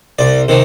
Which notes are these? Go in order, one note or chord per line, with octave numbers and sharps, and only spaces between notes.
C2 D5
C3 D#3